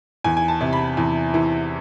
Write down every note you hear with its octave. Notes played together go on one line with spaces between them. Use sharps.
E2 G#5
G#5
A5
C3
B5
E2
E3